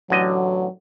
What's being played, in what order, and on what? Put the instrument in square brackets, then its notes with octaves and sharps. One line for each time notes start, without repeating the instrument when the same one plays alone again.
[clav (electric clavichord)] A1 D3 D#5 [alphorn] F#3